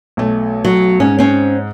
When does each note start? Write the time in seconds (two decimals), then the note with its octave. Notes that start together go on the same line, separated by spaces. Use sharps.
0.17 B1 A3
0.65 F#3
1.00 G#2 C#4
1.19 C4 C#4